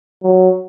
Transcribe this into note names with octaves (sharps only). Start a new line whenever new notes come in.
F#3